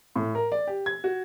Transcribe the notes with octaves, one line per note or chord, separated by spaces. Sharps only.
A2
A#4
D5
G4
G#6
F#4